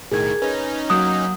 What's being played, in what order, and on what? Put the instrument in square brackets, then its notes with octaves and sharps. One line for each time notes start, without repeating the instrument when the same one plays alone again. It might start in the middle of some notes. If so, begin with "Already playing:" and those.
[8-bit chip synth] B1 A2 D#3 [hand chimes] G#4 A#4 G#6
[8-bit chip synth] C#4 D#4 [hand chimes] B4
[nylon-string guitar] F#3 A#3 [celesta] D#6 [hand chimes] F#6 G6